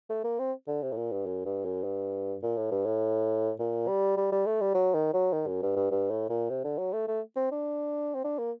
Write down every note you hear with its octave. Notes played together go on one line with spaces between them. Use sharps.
A3
A#3
C4
D3
C3
A2
A#2
G2
F#2
G2
F#2
G2
A#2
A2
G2
A2
A#2
G3
G3
G3
A3
G3
F#3
D#3
F#3
D#3
F#2
G2
G2
G2
A2
A#2
C3
D3
F#3
A3
A3
C4
D4
C4
D4
A#3